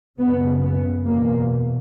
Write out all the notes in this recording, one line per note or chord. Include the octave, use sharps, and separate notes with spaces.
F#2 C#3 B3
B3
E2 B2 A#3